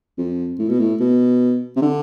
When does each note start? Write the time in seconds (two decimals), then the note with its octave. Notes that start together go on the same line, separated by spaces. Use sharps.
0.18 F2
0.59 A2
0.69 B2
0.80 A2
1.00 B2
1.76 C3
1.82 D3